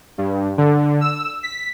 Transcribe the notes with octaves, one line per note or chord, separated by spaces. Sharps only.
G2
D3
E6
B6